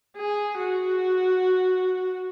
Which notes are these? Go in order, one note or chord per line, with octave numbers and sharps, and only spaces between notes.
G#4
F#4